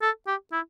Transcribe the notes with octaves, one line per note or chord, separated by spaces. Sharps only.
A4
G4
E4